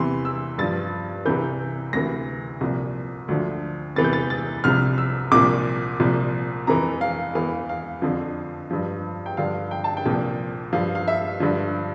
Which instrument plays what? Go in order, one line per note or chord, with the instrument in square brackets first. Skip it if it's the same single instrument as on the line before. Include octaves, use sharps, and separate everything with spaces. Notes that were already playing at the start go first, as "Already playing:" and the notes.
Already playing: [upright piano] E2 C3 E3 C6
E6
G2 F3 A6
C2 C3 E3 G6
D2 C3 E3 A#6
C2 A#2 F3
D2 D3 F3
E2 C3 E3 A6
G6
A6
A6
C2 C3 F3 F6
E6
C2 A#2 F3 D6
C2 A#2 F3
F2 E3 A#5
F5
E2 E3 F5
F5
F2 D3 F3
G2 F3
G5
G2 D3 F3 F5
G5
A5
G5
C2 A#2 F3
G2 F3 F5
F5
E5
G2 D3 F3